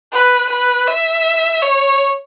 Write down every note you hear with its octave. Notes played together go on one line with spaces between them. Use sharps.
B4
B4
E5
C#5